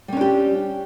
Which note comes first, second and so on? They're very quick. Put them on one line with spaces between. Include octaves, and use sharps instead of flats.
G3 C#4 D4 G4